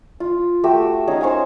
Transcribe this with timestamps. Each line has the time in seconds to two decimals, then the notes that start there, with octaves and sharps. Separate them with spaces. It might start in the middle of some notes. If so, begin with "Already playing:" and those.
0.20 F4
0.64 A3 F#4 G4 E6
1.07 C#4 D#4 G#4
1.21 C5 C#5 F5 G#5